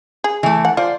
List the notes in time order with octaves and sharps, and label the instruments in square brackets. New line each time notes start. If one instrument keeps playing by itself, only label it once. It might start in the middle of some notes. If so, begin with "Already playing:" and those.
[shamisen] G#4
[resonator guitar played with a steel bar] E3 A3
[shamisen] F#5
[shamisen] F4 [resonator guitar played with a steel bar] C5 D5